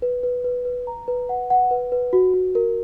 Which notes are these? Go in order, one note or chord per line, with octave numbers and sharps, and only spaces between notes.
B4
B4
B4
B4
A#5
B4
F#5
F#5
B4
B4
F#4
F#4
A#4